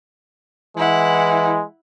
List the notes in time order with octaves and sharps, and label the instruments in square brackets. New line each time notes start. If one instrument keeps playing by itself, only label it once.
[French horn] E3 [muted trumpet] G#3 [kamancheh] E4 F#5